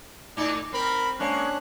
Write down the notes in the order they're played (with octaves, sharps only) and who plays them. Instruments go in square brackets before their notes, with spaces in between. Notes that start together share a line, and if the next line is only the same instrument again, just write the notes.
[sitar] A2 D#4 [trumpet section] D5
[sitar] C4 [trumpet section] A#4 B5
[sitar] G#3 [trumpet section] A#3 C#6 [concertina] C#4 D4 F#6